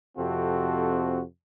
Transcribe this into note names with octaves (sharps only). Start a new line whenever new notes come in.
F2 C3 C4 F#4 A4